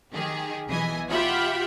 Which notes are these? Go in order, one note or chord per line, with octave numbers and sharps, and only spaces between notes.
D#3 G4 G#4
B1 E3 D#5 G#5
F4 G4 E5 F#5 B5